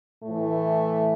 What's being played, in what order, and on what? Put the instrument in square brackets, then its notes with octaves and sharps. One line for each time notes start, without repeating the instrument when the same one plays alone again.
[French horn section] A2 E3 A3